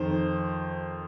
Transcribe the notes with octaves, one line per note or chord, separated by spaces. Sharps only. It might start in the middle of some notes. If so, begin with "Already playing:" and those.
Already playing: F2 D#3 C5